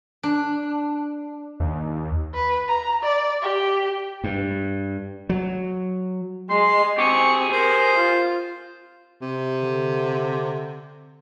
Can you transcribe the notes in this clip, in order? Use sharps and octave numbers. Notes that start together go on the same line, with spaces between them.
D4
D#2
B4
A#5
D5
G4
G2
F#3
G#3 C6
C4 G4 G#4 C#6
A#4 C5
F4
C3
D3